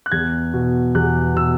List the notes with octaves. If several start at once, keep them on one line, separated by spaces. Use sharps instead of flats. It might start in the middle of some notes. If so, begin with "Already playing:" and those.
F#6
E2 G#6
B2
E2 F#6
B2 E6